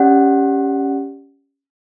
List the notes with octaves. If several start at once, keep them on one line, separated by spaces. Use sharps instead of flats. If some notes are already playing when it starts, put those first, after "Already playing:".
Already playing: C#4 G4 D5 F#5